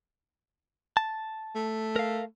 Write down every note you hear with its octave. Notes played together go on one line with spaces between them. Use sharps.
A5
A3
A#4 F5